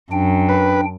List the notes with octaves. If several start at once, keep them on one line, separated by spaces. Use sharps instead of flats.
F#2 D4 G5
B4